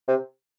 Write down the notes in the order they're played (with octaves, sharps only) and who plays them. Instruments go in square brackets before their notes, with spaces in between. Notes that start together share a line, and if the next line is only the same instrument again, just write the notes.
[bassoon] C3